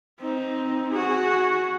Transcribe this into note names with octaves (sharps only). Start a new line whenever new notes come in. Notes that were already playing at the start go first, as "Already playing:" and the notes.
C4 D#4
F#4 G#4